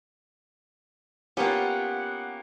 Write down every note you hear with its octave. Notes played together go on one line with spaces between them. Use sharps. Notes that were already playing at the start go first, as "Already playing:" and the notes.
A#3 B3 C#4 F4 G4 F#5